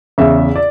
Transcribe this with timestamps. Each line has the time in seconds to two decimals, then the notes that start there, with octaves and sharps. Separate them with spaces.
0.18 E2 C#3 E5
0.56 D5